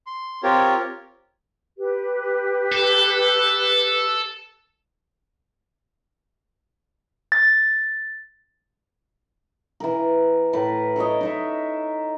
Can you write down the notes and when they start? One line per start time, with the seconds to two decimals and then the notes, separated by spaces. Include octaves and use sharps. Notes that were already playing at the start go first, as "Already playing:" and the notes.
0.06 C6
0.43 C4 F4 G4 A#4 C#5
1.78 G4 B4
2.72 A4
7.32 A6
9.80 E3 A#4
10.53 A2 A#4 B4
10.96 A4 A#4 C#5 D#5
11.21 D#4 C#5 E5